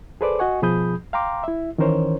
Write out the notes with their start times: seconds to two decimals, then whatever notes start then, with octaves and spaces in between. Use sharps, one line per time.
0.21 G#4 A4 B4 C5 D5 D6
0.39 F#4 D#5 F#5 G#5 C#6
0.62 B2 F3 G#4 B5 D#6 G6
1.13 F5 G5 A#5 C6 D6
1.44 E4 E5
1.78 D#3 E3 C#4 A#4 C5 C#5